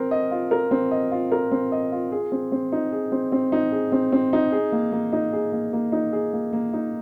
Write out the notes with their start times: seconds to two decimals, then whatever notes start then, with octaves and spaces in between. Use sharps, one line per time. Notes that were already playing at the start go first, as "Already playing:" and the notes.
Already playing: C4 A#4
0.11 D#5
0.31 F4
0.51 A#4
0.71 C4
0.91 D#5
1.11 F4
1.32 A#4
1.52 C4
1.72 D#5
1.92 F4
2.12 G#4
2.32 C4
2.52 C4
2.72 D#4
2.92 G#4
3.12 C4
3.32 C4
3.52 D#4
3.72 G#4
3.92 C4
4.12 C4
4.33 D#4
4.52 G#4
4.72 A#3
4.92 A#3
5.13 D#4
5.33 G#4
5.52 A#3
5.73 A#3
5.92 D#4
6.13 G#4
6.33 A#3
6.53 A#3
6.73 D#4